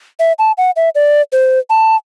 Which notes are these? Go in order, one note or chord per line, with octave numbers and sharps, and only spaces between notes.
E5
A5
F#5
E5
D5
C5
A5